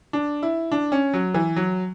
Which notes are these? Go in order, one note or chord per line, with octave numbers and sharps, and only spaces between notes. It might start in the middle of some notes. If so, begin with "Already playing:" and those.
D4
E4
D4
C#4
F#3
E3
F#3